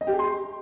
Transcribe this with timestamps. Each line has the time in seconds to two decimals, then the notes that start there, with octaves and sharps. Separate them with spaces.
0.01 D#5
0.07 G4
0.13 G#4
0.19 C6